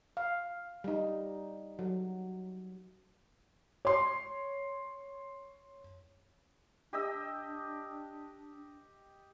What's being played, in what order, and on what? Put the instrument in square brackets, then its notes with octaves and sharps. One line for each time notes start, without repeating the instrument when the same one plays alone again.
[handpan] F5
G3 D#4
F#3
[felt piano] C#5 C6
[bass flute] D4 [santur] G4 D#5 E6